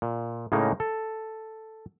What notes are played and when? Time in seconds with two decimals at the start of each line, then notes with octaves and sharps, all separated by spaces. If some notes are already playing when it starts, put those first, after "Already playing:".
0.02 A#2
0.52 A2 C#3 G#3 A#3 D#4
0.80 A4